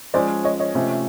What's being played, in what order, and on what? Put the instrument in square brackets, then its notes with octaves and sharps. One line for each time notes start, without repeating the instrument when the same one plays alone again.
[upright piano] F3 G#3 C#4 [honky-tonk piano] C5 D5
[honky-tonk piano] C#5 D#5
C#5 D#5
[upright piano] C3 F3 A3 C#4